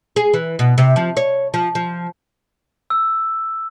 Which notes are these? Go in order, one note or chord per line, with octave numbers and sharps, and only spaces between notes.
G#4
E3
B2
C3
F3
C#5
F3
F3
E6